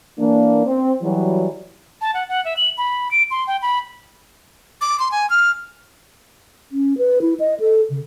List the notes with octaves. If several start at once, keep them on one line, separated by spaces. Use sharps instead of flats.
E3 A#3 D4
C4
E3 F#3 G3
A5
F#5
F#5
E5
F#7
B5
D7
C6
G5
B5
D6
C6
G#5
F6
C#4
B4
E4
D#5
A4
C#3